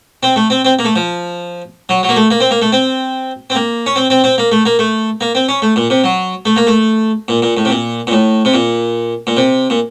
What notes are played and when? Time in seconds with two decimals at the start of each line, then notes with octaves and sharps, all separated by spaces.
0.23 C4
0.36 A3
0.50 C4
0.65 C4
0.79 A#3
0.85 A3
0.96 F3
1.89 F#3
2.03 F#3
2.09 A#3
2.16 A3
2.31 A#3
2.40 C4
2.51 A#3
2.62 A3
2.72 C4
3.50 C4
3.55 A#3
3.86 C#4
3.96 C4
4.10 C4
4.24 C4
4.38 A#3
4.52 A3
4.66 A#3
4.79 A3
5.21 A#3
5.35 C4
5.49 C#4
5.62 A3
5.76 A#2
5.90 C3
6.04 F#3
6.46 A3
6.56 A#3
6.67 A3
7.28 A#2
7.42 A#2
7.57 A2
7.65 C3
7.70 A#2
8.07 A#2
8.12 A2
8.45 C3
8.54 A#2
9.27 A#2
9.37 C3
9.70 A#2